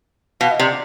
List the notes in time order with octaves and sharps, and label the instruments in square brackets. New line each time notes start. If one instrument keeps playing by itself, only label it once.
[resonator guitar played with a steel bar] B2 [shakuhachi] F5
[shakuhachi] D#5
[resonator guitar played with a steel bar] C3 [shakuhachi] D5